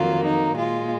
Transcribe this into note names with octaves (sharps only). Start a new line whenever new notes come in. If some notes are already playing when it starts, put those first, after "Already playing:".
Already playing: F2 D#3 F#3 A#3 F4
D#4
A#2 G#3 F4